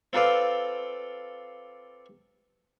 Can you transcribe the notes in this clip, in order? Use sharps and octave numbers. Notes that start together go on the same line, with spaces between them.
C4 F4 A4 B4 D5 F5